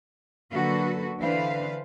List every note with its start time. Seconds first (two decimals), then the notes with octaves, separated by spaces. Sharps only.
0.52 D3 F#3 A#3 F#4 A4 B4
1.20 D3 E3 D4 B4 C5 F5